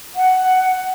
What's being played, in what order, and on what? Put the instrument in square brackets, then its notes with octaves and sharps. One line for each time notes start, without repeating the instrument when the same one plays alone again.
[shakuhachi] F#5